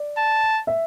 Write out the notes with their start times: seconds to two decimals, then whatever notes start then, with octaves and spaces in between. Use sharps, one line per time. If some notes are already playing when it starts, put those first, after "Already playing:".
Already playing: D5
0.18 A5
0.67 E5